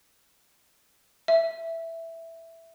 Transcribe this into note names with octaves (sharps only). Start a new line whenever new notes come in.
E5